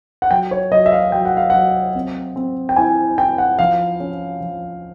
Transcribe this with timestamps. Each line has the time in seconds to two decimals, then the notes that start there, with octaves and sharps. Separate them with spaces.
0.22 F#5
0.31 F#3 G5
0.51 C#5
0.72 F#3 D#5
0.86 E5
0.92 F5
1.12 F#3 G5
1.25 F#5
1.37 F5
1.50 F#3 F#5
1.95 C4
2.36 C4
2.69 G5
2.76 E4 G#5
3.18 E4 G5
3.38 F#5
3.59 F3 F5
4.00 C#4
4.41 F3